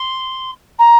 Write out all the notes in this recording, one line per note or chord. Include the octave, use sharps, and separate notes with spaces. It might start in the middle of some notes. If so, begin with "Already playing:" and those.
Already playing: C6
A#5